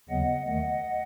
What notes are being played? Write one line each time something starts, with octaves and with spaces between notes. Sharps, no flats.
D#2 C#3 F#3 B3 D#5 F#5
D#2 D#3 A3 D#5 F#5